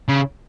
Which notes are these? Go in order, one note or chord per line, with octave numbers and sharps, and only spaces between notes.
C#3